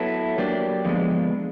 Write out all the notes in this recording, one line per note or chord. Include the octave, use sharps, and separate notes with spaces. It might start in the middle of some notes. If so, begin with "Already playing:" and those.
Already playing: F#3 B3 E4 A4
F#3 A#3 D4 G4
D3 F3 G#3 B3